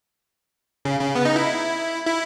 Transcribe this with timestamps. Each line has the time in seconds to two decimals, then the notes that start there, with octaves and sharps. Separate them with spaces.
0.85 C#3
1.01 C#3
1.15 B3
1.25 D#4
1.36 E4
2.07 E4